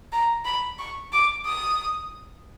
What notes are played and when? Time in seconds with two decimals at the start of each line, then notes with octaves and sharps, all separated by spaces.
0.12 A#5
0.45 B5
0.79 C#6
1.13 D6
1.46 D#6